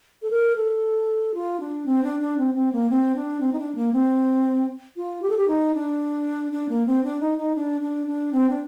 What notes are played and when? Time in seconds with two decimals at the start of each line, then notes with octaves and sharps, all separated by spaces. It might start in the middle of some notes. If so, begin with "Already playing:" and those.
0.22 A4
0.30 A#4
0.56 A4
1.34 F4
1.60 D4
1.86 C4
2.03 D4
2.20 D4
2.38 C4
2.54 C4
2.72 A#3
2.90 C4
3.15 D4
3.41 C4
3.53 D#4
3.59 D4
3.75 A#3
3.93 C4
4.96 F4
5.22 G4
5.30 A4
5.37 G4
5.48 D#4
5.74 D4
6.52 D4
6.69 A#3
6.86 C4
7.04 D4
7.20 D#4
7.38 D#4
7.56 D4
7.81 D4
8.07 D4
8.33 C4
8.49 D4